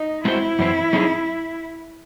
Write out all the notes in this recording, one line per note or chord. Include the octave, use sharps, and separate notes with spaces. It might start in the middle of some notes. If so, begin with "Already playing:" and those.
Already playing: D#4
G#3 C4 E4 F#4 C5
F#2 E3 C4
F#3 C4 D#4 G#4